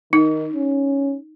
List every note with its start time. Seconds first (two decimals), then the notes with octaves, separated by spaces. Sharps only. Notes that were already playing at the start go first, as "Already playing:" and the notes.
0.13 D#3 D#4
0.53 C#4